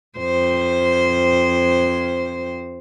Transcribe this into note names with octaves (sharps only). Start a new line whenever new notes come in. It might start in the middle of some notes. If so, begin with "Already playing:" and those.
F2 C5